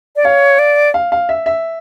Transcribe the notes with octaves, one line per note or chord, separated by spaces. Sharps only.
D5
C#5 F5
D5
F5
F5
E5
E5